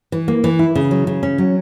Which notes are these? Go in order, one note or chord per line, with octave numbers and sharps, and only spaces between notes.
E3
A#3
E3
E4
C#3
F#3
C#3
C#4
F#3